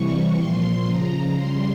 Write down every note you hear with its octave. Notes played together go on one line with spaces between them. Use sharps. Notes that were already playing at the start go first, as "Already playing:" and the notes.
Already playing: C3 E3 G3 C#6
A#2 F3 C6
C#3 F3 A#5
C#3 G3 C6